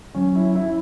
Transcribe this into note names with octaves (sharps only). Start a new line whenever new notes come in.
F#3 C#4
E4
E4